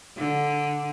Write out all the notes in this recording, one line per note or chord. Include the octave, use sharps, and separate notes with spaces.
D3